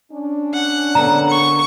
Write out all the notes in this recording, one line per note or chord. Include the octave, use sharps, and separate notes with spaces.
C#4 D4
F#5
D3 A#3 B3 A#5
C#6